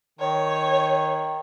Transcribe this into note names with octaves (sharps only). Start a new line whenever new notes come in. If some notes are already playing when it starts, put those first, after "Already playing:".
D#3 C#5